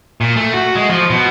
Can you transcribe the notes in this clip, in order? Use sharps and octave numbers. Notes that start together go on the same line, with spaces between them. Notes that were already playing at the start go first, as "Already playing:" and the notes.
A#2
A3
F#4
G#3
F3
B2